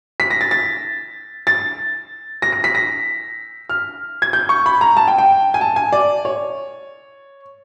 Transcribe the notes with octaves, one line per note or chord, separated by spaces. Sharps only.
B6
A#6
A6
A6
A6
A#6
A#6
B6
A#6
F6
G#6
G6
C#6
B5
A#5
A5
G5
G5
G#5
A5
G#5
D5
C#5